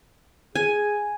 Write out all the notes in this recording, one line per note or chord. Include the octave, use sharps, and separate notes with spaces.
G#4 G#5